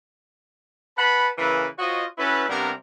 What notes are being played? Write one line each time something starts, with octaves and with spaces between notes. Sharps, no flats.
B4 F#5 A5 B5
C#3 E3 A#3 A4 B4
F4 F#4 C5 C#5 D#5
C#4 E4 F#4 A4 B4
C3 G3 A#3 B3 D4 A#4